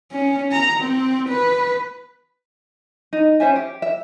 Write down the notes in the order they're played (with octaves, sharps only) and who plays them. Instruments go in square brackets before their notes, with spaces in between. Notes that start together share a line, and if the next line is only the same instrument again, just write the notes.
[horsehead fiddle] C#4
A#5
C4
B4
[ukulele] D#4
C#4 C5 E5 G#5
G4
E5